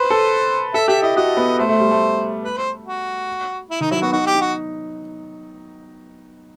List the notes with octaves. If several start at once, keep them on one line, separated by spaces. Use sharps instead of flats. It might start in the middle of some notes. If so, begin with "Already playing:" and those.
Already playing: B4 C5
A4
A4 E5
G4 E5
E4 D#5
F#4 D#5
B3
A3 C5
A3
G3
A3
B4
C5
F#4
E4
D#3 D#4
F#3 E4
B3 F#4
D#4 F#4
G4
D#4
F#4